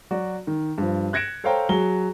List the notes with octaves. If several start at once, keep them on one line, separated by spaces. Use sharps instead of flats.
F#3 F#4 D5
D#3
G2 F3
F#6 G#6 A#6 C#7 D7 E7
A4 C5 C#5 F5 G5 A#5
F#3 G#4 G7